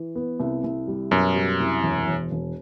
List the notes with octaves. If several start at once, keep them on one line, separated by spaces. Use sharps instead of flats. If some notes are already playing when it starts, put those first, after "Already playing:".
Already playing: E3
B3
C2
C2
G3
F#2 B2
G3
C2
E1
E1
E1